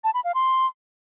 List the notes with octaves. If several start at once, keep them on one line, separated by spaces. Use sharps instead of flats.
A5
B5
F5
C6